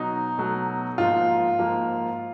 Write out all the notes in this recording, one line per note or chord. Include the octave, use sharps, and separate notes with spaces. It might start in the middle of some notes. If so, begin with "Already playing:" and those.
Already playing: B2 F#3 D#4
B2 F#3 A3
G#2 F3 A#3 F4
G#2 F3 A#3